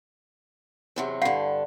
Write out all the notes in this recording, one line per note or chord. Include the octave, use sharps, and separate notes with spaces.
E2 C3 F#3
G2 D3 F5 F#5